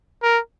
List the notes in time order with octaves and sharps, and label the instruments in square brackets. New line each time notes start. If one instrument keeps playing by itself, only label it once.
[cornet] A#4